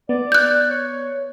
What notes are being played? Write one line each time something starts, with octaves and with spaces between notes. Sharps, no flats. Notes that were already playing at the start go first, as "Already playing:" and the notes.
B3 D5
F#6 G6
C#5